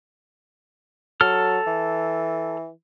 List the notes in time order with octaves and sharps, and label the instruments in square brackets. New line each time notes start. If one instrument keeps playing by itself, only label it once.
[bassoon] F#3 [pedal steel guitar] A4 F6
[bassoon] E3